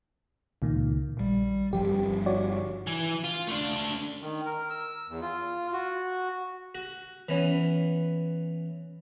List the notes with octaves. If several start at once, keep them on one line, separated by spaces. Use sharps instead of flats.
C#2 A#2 D#3
A#1 G3
G1 F3 G3 G4
F#4 C#5 D5
E3
F4
A3 D4
D#3
A#4
E6
E2
F4
F#4
F#4
E3 B3 C#4